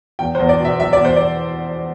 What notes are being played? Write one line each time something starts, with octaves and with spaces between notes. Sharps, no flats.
E2 G5
C5
E2
D5
B2
E5
F#3 E5
D5
E2 C5
D5